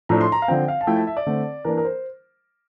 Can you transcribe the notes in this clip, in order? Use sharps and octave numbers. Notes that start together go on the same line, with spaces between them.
A2 F3 A3 D4 A#5
C6
A#5
F5
D3 F3 C4 G5
F5
A5
F3 A3 E4 G5
A5
E5
D5
D3 A3 C4
E3 A#3 D4 A#4
A#4
C5